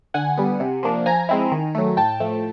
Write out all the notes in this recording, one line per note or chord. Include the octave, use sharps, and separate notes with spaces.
D3 F#5 G#5
G3 B3
C3
F3 A#3 D4
F3 G#5 A#5
G#3 C4 E4
D#3
F#3 A3
A2 G5 A5
F3 A3